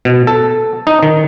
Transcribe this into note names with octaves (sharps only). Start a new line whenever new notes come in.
B2
A4
D#4
D#3